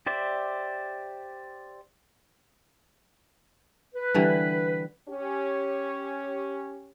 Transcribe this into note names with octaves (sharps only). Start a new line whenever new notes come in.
G4 C5 D5 E5
B4
D3 E3 G3
C#4 G4 C#5